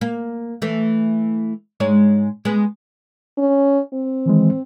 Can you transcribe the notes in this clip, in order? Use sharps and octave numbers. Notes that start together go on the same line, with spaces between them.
A#3
E3 A3
G#2 G#3 C#5
G#3 B3
C#4
C4
D#3 E3 G#3